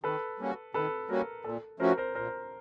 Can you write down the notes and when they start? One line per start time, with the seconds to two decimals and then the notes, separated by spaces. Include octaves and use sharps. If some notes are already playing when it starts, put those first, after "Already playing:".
0.04 D#3 A4 B4
0.40 G3 A#3 C#4 F#4
0.74 D#3 A4 B4
1.09 G3 A#3 C#4 F#4 A#4
1.44 A#2 A4
1.80 F3 A3 C#4 F#4 A#4 C5
1.98 A#4 C5
2.15 A#2 A#4 C5